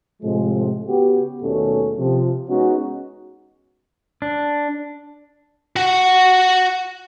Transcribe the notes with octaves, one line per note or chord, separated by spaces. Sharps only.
A2 C3 F3 G#3
C#3 B3 F#4 G4
D#2 B2 A3 C#4 D4 G#4
C3 F3
G#3 B3 C#4 D#4 F#4
D4
F#4 F#5